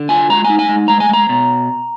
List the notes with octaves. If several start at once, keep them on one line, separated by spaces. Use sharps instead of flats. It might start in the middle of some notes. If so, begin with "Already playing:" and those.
Already playing: D3
F4 G#5
G#3 A#5
G#5
D#4
G#5
G#3
G#3 A#5
G#5
G#3 A#5
B2